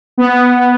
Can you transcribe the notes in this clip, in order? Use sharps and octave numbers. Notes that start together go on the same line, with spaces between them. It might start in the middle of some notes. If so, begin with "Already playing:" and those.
B3